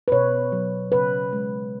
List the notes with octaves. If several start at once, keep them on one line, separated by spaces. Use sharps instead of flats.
B4
B2 C#5
F#3
C#3 B4
G#3